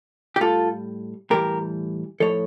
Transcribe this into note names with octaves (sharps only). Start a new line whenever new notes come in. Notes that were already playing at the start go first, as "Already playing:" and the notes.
G4
A2 G3 F4 A4
A2 E3 G3 G4 A#4
A2 F3 A4 C#5